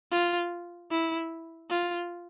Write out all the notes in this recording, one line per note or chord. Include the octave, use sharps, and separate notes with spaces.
F4
E4
F4